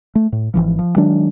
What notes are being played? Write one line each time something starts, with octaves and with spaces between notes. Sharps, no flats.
A3
A2
G#1 D#2 E3 F3
F3
D#3 F#3 G#3 D4